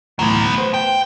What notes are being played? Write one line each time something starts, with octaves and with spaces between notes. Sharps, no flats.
D2 A2 E3 F#3 B3
B4 C5
G5